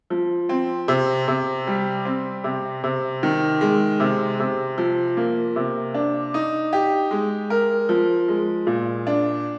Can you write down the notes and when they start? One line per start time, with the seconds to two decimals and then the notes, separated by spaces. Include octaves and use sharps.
0.10 F3
0.49 C4
0.88 C3
1.28 C3
1.67 G3
2.05 C4
2.44 C3
2.84 C3
3.23 D#3
3.61 G#3
4.00 C3
4.40 C3
4.78 F3
5.17 A#3
5.56 C3
5.94 D4
6.34 D#4
6.73 G4
7.11 G#3
7.50 A#4
7.89 F3
8.28 G#3
8.67 A#2
9.07 D4